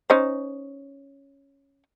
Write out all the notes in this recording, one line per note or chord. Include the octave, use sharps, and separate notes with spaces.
C#4 D#4 C5